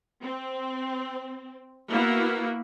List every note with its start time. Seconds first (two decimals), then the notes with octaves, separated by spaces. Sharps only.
0.22 C4
1.91 A#3 B3 E4 F#4